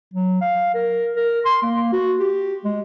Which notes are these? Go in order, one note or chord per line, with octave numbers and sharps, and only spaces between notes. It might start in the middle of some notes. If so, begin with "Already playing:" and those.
F#3
F5
A#4
A#4
C6
A#3
F#4
G4
G#3